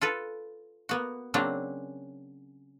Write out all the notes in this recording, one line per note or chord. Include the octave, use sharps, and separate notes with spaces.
F4 A4 B4
A#3 B3 F#4
C#3 F#3 A#3 C4 D4